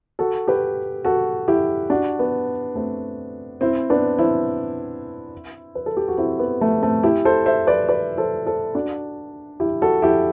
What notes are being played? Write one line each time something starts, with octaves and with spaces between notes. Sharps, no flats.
F#4 A4
G4 B4
F#4 A4
E4 G4
D4 F#4
B3
A3 C4
C4 E4
B3 D4
C4 E4
B4
A4
G4
F#4
C4 E4
B3
A3
A3 C4
E4 G4
A4 C5
C5 E5
B4 D5
B4 D5
A4 C5
A4 C5
D4 F#4
E4 G4
F#4 A4
E4 G4